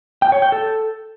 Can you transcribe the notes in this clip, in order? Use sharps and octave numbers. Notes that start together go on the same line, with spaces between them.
G5
C#5
G5
A4